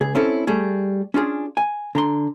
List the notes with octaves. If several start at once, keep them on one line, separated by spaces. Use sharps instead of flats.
C#2 G#4
C4 C#4 E4 A4
G3 A3 G#4
C#4 D4 F4 G#4
G#5
D3 A#5 C6